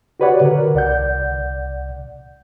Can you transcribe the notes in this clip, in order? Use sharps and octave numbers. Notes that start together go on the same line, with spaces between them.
F#4 G4 B4 C#5 D5 F#5
D3 A#4
C2 D5 F#5 G6